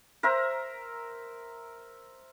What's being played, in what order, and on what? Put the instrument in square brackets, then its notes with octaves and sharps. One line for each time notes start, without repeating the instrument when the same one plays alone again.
[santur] A#4 C5 E5 A#5